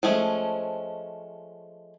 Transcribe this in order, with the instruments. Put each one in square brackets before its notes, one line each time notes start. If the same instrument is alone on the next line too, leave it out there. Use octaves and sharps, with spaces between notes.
[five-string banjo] F3 G#3 A3 C#4